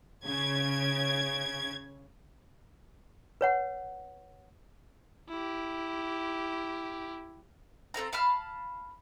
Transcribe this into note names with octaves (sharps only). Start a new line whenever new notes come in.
C#3 G#6
B4 C#5 F#5
E4 G4
C4 A4 F5 A#5
F5 A5 B5 F6